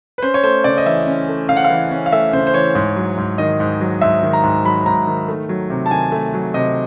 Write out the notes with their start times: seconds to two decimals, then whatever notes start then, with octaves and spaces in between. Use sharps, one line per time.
0.18 B4
0.22 C#4 C5
0.34 C#5
0.44 A3 C5
0.64 C#3 D5
0.78 D#5
0.86 E3 E5
1.07 C#4
1.29 A3
1.49 C#3 F5
1.56 F#5
1.64 F5
1.70 E3
1.91 C#4
2.06 F5
2.12 A3 E5
2.33 C#3 C5
2.47 C5
2.54 E3 C#5
2.75 G#2
2.96 F#3
3.17 G#2
3.38 D#3 D#5
3.60 G#2
3.81 F#3
4.01 G#2 E5
4.23 D#3
4.33 A#5
4.43 G#2
4.65 F#3 B5
4.86 G#2 A#5
5.07 D#3
5.28 A3
5.49 F#3
5.70 C3
5.86 A5
5.91 D#3 G#5
6.12 A3
6.34 F#3
6.54 C3 D#5